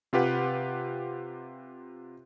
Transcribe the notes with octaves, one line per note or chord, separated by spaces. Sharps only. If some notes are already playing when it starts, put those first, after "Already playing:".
C3 F4 G4 B4 F#5